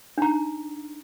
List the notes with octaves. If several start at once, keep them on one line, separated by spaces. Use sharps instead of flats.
D4 D#4 A#5